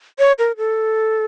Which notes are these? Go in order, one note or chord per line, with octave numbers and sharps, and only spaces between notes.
C#5
A#4
A4